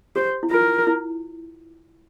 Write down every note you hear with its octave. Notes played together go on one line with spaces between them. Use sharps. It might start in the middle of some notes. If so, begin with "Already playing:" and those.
G4 C5
E4
F4 A#4
E4